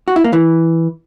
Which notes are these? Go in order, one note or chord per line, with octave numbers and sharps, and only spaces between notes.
F#4
E4
A#3
E3